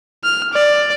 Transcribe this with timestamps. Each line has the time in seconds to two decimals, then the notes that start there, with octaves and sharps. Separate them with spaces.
0.24 F6
0.53 D5